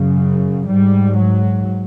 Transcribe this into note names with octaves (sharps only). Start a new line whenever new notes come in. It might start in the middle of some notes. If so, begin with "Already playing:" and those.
Already playing: F#2 C#3
G#2 G3
F#3